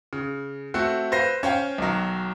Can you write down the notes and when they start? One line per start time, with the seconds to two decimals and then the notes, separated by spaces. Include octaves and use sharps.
0.13 C#3
0.74 A3 C4 F#4
1.12 B4 C5 F5 A#6 C7
1.43 C#4 C5 F5 G5
1.78 B1 D#3 F#3